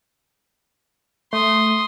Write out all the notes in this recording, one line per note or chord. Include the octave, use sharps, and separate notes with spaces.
A3 C6 D#6